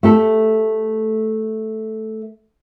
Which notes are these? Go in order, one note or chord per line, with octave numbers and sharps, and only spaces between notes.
A3 G4 A4